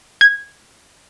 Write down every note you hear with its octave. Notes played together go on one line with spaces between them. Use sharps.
G#6